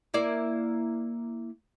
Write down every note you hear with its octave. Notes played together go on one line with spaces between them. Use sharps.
A#3 E4 D5